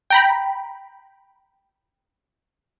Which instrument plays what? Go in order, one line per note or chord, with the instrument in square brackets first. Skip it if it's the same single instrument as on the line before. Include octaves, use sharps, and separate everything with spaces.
[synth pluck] G5 A#5 B5